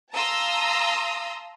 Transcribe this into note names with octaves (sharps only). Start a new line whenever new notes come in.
F5 A5 A#5 C6 D#6 E6